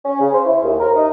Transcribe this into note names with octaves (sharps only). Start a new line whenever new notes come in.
C#4
C#3
C5
E4
D#2
A#4
D#4